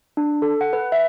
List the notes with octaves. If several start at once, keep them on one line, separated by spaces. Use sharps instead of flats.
D4
A4
F#5
B4
E5